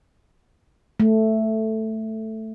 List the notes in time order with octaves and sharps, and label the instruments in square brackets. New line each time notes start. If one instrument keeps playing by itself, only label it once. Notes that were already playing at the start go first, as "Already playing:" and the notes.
[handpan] A3